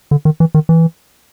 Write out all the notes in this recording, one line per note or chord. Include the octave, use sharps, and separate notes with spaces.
D3
D#3
E3
D#3
E3